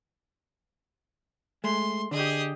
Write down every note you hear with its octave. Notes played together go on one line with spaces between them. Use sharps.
G#3 A3 C6
D3 G4 G#4 D#5